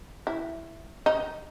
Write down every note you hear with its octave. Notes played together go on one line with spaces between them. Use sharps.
E4
D#4